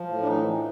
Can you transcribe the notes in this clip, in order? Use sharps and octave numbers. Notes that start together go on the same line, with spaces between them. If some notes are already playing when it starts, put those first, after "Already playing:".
Already playing: F3
A2
D4
E3 D#4
E3